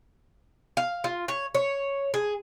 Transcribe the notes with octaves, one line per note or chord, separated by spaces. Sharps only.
F5
F4
C#5
C#5
G#4